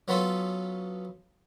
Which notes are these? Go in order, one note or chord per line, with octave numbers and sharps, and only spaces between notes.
F#3 B3 C#4 F4 A4